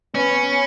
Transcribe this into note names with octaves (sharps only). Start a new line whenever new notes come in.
B3 C#4